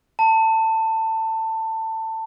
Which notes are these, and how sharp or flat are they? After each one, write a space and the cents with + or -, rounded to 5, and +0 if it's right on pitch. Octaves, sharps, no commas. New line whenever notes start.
A5 +20